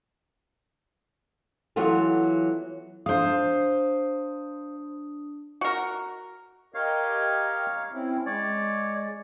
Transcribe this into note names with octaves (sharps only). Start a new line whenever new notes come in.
E3 F#3 B3 F4 A4
D4 C5 F5 D#6
F#4 A#4
G4 A#4 C#5 D#5 F5
C4 C#4 E4
G#3 C#5 D5